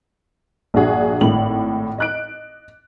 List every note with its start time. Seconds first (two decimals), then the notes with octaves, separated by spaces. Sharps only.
0.74 A#1 G2 D4 F#4 G#4
1.21 G#1 A2 F#7
1.98 D#5 F#6 D7